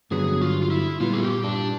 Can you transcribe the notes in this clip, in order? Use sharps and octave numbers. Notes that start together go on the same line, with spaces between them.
G2 D3 F#3 B3 G#4
F4
F4
E4
A#2 G3 B3 F4
G#4
G4
D4